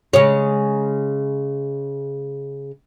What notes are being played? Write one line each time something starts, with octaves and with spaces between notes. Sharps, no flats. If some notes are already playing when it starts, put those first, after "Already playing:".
C#3 G#3 C#5